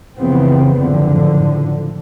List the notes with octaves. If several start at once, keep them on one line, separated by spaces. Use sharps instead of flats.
F1 C#3 E3 F3 B3 C4
F#1 A2 D3 F3